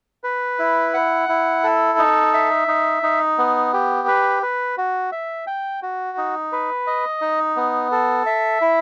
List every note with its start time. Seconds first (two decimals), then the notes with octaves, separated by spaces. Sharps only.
0.24 B4
0.59 E4
0.94 F#5
1.29 E4
1.64 A4
1.98 D#4
2.34 E5
2.68 D#4
3.03 D#4
3.38 B3
3.73 G4
4.08 B4
4.42 B4
4.77 F#4
5.12 E5
5.47 G5
5.82 F#4
6.18 D#4
6.52 B4
6.87 D#5
7.21 D#4
7.56 B3
7.92 A4
8.26 E5
8.61 E4